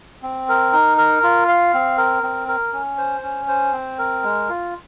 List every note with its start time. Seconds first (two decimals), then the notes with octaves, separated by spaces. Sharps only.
0.23 C4
0.49 A#4
0.73 D#4
0.98 A#4
1.23 F4
1.48 F5
1.74 C4
1.98 A#4
2.23 C4
2.48 A#4
2.73 C#4
2.98 C5
3.23 C#4
3.48 C5
3.73 C4
3.99 A#4
4.23 G#3
4.49 F4